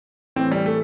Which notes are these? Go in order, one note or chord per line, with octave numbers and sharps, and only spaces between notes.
A2 E3 C4
G3
A3